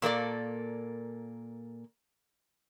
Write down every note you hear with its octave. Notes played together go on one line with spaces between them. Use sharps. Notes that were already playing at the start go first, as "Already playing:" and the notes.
A#2 A#3 A4 D5